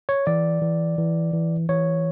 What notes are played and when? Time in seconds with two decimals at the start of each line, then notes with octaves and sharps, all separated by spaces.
0.09 C#5
0.27 E3 D5
0.62 E3
0.98 E3
1.33 E3
1.69 E3 C#5